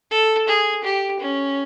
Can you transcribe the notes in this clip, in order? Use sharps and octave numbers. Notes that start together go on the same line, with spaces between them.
A4
G#4
G4
C#4